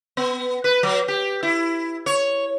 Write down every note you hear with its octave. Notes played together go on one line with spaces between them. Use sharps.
B3
B4
F#3
G4
E4
C#5